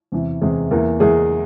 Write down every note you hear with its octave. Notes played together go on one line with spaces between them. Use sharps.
E2 C3 E3
E2 C3 E3 G#3 G#4
E2 E3 A#3 A#4
E2 E3 G#3 G#4